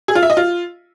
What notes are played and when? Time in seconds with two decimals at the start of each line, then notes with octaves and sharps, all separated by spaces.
0.08 G#4
0.15 F4
0.23 E5
0.30 D#5
0.37 F4